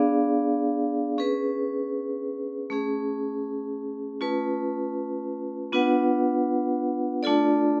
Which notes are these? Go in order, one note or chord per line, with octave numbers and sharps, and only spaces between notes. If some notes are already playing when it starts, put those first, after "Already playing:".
Already playing: B3 D4 G#4 D5 F5
C#4 G#4 B4
A3 C#4 G#4
A3 C#4 F4 B4
B3 D4 F4 B4 F#5
A3 D4 F4 A4 D5